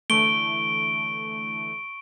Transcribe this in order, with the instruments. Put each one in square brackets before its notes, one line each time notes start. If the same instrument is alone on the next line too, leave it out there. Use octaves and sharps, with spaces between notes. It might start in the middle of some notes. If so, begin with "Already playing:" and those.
[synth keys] D3 E3 A3 [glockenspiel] C#6 G7 [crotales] D7